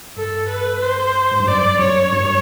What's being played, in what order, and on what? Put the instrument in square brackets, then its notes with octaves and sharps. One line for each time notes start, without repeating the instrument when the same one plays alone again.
[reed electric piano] G2 [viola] A4
[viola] B4
C5
[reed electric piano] G#2
G2
[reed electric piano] F#2 [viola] D5
[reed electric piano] F#2 [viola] C#5
[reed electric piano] G2